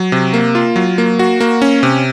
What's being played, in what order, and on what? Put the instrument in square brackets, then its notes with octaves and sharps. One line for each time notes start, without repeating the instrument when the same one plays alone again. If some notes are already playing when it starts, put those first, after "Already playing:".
Already playing: [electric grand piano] F#3
C3
A#3
F4
F#3
A#3
F#4
A#3
C#4
C3